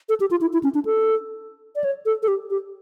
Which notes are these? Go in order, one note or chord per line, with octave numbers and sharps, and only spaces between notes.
A4
G4
F4
E4
E4
C#4
D4
A4
D5
C#5
A4
A4
G4
G4